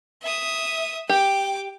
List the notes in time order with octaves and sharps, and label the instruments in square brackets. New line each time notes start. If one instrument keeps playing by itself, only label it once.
[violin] E5 D#6
[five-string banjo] G4 [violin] G5 D6